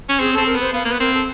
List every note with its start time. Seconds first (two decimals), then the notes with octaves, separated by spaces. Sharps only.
0.09 C#4
0.20 C4 G#4
0.33 C4 A4
0.46 A#4
0.55 B3 C5
0.73 B3 F5
0.85 A#3 B4
0.92 B3
0.99 C4 A#4
1.13 A4